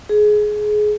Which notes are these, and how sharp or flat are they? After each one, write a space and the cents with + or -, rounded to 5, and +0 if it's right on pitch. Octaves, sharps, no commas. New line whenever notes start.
G#4 +20